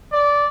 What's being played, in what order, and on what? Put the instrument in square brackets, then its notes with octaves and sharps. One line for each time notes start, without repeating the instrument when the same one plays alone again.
[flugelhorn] D5